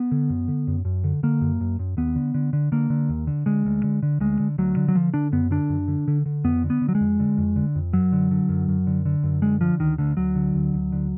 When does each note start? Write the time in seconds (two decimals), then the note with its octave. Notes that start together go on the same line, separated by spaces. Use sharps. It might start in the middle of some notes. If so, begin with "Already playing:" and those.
Already playing: B3
0.12 D3
0.30 F#2
0.48 D3
0.67 F#2
0.85 F#2
1.04 D3
1.23 D3 A#3
1.41 F#2
1.61 F#2
1.79 F#2
1.97 D#2 B3
2.16 D3
2.34 D3
2.53 D3
2.72 D3 A#3
2.90 D3
3.09 D#2
3.27 D3
3.46 D3 G#3
3.65 D2
3.84 D3
4.03 D3
4.21 D2 G#3
4.39 D3
4.58 D2 F#3
4.77 D3
4.88 F#3
4.95 D3 F3
5.14 D3 D4
5.32 F#2 B3
5.51 D3 D4
5.69 F#2
5.88 D3
6.08 D3
6.26 D3
6.44 F2 B3
6.63 D3
6.70 B3
6.82 D3
6.89 F#3
6.95 G#3
7.00 F2
7.20 D3
7.38 F2
7.56 D3
7.75 F2
7.93 F#2 F#3
8.12 D3
8.31 D3
8.49 F#2
8.69 F#2
8.87 D3
9.05 D3
9.23 F#2
9.42 D3 G#3
9.61 D3 F3
9.80 D2 D#3
9.98 D2 D3
10.17 D2 F#3
10.35 D3
10.54 D2
10.74 D2
10.92 D3